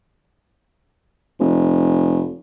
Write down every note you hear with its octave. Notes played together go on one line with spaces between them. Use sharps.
F1